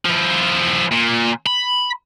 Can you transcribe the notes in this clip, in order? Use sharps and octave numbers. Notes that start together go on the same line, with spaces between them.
F3 E4
A#2
B5